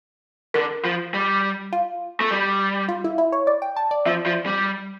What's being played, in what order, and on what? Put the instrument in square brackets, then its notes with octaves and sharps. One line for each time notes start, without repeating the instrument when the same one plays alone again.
[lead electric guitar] D3 [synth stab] A#4
[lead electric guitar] F3
G3
[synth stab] F4
[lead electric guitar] A3
G3
[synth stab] F4
E4
E4
C#5
D5
G5
A5
D5
[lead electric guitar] F3 [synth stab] E5
[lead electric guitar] F3
G3